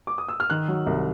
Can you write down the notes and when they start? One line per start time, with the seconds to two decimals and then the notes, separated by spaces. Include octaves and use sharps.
0.07 D6
0.18 D#6
0.28 E6
0.40 F6
0.50 D#3 F#6
0.68 F#3
0.87 C2